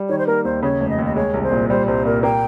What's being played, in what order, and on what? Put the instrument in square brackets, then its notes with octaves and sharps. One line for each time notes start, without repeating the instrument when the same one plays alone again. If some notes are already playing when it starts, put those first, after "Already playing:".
Already playing: [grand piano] G3
[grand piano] D#3 [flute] C#5
[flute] C5
[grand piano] A#3 [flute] A#4
[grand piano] D#2 [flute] C5
[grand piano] C#3 [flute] C#5
[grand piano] F1
[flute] D#5
[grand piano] D#2
[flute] D#5
[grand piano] G#3 [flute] C#5
[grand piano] C2
[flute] C5
[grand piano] A#2
[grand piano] G3 [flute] C5
[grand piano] C2 [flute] C5
[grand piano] A#2 [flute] A#4
[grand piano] A#3 [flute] G5